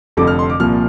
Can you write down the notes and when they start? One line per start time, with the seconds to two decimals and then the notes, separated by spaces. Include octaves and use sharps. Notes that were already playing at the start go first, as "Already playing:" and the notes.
0.17 F1 F2 D3 F3 D6
0.27 F6
0.39 C6
0.50 D6
0.60 C2 A#2 F3 F6